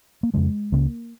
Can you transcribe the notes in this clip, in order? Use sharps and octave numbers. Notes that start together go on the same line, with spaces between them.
A#3
F2 C#3 G#3
C#2 C#3 A#3